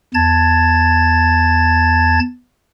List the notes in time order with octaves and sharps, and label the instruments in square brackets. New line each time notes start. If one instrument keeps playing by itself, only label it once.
[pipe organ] E2 A5 G#6 A6